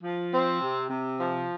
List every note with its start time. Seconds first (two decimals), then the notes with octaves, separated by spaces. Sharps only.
0.03 F3
0.33 C4
0.61 C3
0.90 C3
1.19 F3